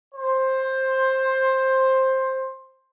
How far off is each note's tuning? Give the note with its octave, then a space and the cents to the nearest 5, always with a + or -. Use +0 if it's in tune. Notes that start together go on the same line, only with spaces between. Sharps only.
C5 +10